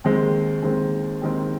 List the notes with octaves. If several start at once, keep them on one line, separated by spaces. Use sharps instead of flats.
D#2 D#3 G#3 C4
D#2 D#3 G#3 C4
D#2 D#3 G#3 C4